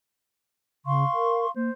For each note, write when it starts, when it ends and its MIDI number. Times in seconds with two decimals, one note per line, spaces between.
0.85 1.04 49
0.85 1.50 77
0.85 1.50 84
0.85 1.50 85
1.14 1.46 70
1.56 1.70 58
1.56 1.72 72